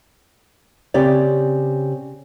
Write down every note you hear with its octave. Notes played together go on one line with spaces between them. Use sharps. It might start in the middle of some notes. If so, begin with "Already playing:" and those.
C#3 C4 G4 C#5 D5